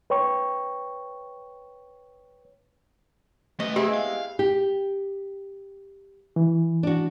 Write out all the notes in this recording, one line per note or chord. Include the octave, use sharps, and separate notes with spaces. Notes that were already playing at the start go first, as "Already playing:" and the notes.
B4 C#5 G5 C#6
A3 F#4 B4 D#5
G#3 B3 C4 E4 G4
F5
G4
E3
D4 F#4